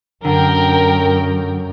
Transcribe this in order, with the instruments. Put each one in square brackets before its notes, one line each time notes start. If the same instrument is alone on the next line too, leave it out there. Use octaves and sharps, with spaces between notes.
[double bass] F#2 [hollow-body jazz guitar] D3 [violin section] A#4 G5